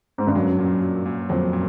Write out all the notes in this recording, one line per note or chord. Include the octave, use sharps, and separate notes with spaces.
G#2
G2
F#2 F#3
A#2
F#3
A#2
F2 F#3
A#2